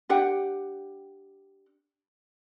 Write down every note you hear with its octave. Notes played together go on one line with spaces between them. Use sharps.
D4 G4 F#5 G5